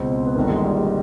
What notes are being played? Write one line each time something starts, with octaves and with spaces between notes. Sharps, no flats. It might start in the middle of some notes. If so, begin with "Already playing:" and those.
Already playing: C#2 B2 C4
B3
G1 G2 D#3 A#3
G#3
G3
G#3